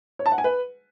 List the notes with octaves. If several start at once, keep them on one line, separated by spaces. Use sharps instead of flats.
C#5
A5
F#5
G#5
B4